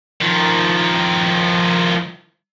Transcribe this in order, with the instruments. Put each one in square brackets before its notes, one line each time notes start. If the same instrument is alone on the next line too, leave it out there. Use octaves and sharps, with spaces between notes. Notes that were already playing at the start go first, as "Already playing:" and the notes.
[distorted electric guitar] D#3 F3